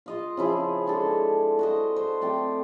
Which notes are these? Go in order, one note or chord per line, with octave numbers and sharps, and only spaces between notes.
F4 D#5 F5
C#3 F3 E4 G#4
G#3 D4 A4
F#4 C5 D#5
C5
A3 C4 D5 G5